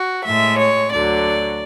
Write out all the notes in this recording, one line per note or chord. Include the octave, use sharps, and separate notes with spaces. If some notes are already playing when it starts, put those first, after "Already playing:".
Already playing: F#4
A2 G#3 E5
C#5
D2 D3 F#3 D5